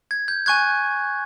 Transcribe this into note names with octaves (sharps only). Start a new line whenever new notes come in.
G#6
G6
G#5 C#6 F#6 G#6